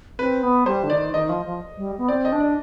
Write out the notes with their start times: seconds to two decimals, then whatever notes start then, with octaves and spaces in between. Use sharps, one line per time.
0.19 C4 B4
0.43 B3
0.66 G3 C5
0.84 D3
0.90 D#3 D5
1.13 D#3 D#5
1.29 F3
1.46 F3
1.77 G3
1.98 B3
2.08 C4 D5
2.25 D#5
2.32 D4
2.40 D5